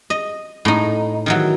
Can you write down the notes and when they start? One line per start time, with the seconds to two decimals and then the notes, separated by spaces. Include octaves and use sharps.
0.10 D#5
0.65 A2 D#4
1.26 D#3 E3 F#3